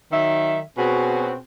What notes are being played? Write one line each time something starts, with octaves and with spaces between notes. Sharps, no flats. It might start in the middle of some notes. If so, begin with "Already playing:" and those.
D#3 F#3 E5
B2 C4 C#4 F#4 G#4